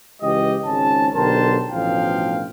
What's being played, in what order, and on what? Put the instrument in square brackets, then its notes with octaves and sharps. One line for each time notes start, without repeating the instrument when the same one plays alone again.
[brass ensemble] C#2 E3 G#3 G4 D#5
G#1 C#2 G#2 C#4 A5
B1 D3 G4 A#4 C5 A5
A1 D2 B2 F3 F5 G5